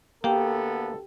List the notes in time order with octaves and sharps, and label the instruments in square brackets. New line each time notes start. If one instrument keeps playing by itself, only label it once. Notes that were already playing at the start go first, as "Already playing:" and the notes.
[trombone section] D2 B3 A4 [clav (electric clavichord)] A#3 [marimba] G4 G5